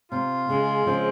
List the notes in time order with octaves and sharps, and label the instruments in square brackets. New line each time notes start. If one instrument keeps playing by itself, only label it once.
[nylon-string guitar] C3 [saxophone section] F4
[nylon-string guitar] C#3 [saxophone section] G#3
[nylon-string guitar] C#3 F3 [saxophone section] C4